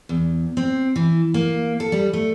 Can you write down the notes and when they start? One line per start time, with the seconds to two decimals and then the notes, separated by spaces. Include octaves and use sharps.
0.09 E2
0.57 C4
0.96 E3
1.34 A#3
1.80 A4
1.92 G3
2.13 A3